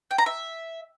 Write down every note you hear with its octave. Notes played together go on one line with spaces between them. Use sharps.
G5
A#5
E5